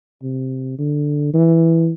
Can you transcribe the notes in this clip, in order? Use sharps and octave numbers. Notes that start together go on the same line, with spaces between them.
C3
D3
E3